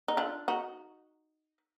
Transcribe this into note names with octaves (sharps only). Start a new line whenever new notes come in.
D#4
D4 F4
D#4 F#4